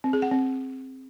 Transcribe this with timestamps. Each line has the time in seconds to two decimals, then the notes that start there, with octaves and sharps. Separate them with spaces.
0.04 C4
0.13 G#4
0.22 F#5
0.31 C4